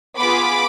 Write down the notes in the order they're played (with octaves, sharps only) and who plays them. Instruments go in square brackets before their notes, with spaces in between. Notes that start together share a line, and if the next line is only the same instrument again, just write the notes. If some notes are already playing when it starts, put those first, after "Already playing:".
[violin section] B3 F4 G#4 B5 D6